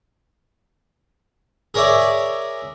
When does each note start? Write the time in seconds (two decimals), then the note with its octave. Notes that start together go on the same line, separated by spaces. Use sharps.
1.74 G#4 A#4 C#5 D5 E5